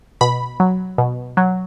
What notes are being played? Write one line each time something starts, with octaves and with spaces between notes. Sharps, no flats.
B2 B5
F#3
B2
F#3